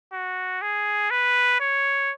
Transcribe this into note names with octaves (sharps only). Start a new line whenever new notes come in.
F#4
G#4
B4
C#5